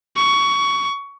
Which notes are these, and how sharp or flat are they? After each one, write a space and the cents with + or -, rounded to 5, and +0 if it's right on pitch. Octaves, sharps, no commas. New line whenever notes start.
C#6 +20